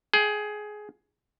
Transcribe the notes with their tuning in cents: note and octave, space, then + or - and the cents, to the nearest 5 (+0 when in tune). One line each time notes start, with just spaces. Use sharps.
G#4 +15 G5 +0